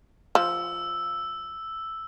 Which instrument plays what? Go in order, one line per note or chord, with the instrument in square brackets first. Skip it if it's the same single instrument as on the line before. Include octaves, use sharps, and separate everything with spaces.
[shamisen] F3 [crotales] E6